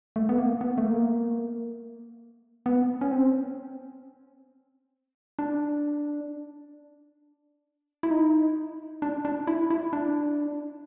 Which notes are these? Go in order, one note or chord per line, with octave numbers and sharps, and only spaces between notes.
A3
B3
A#3
B3
A3
A#3
B3
C#4
C4
D4
E4
D#4
D4
D4
E4
E4
D4